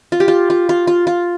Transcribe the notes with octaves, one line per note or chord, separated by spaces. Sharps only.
F4
G4
F4
F4
F4
F4
F4